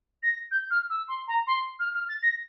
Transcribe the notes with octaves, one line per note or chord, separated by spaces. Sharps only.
A#6
G6
F6
E6
C6
A#5
C6
F6
F6
A6
A#6